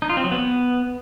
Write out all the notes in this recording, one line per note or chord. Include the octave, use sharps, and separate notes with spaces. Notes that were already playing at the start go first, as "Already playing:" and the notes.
D#4
F4
C4
F#3
B3